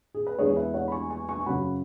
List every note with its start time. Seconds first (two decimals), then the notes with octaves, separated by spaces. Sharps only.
0.15 G#4
0.27 B4
0.38 E2 E3 G#3 G#4 C#5
0.57 B4 E5
0.74 C#5 F#5
0.88 B5
0.92 G#5 C#6
1.10 G#5 C#6
1.29 G#5 C#6
1.40 C#6
1.46 F#2 C#3 F#3 F#5 B5